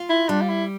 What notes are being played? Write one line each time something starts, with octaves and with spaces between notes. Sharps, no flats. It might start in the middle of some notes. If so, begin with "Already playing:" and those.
Already playing: F4
E4
G3 D4
F4
E4